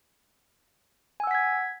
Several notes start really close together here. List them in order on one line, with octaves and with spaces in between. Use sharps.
G#5 E6 F#5 B6 G#6